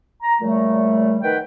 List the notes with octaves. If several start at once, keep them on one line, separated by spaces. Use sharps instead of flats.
A#5
A#2 C#3 F3 G3 A3
D#3 B4 F#5 G5